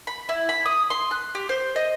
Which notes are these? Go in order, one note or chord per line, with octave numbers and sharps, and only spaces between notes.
B5
E4
B5
D#6
C6
F#6
G4
C5
D#5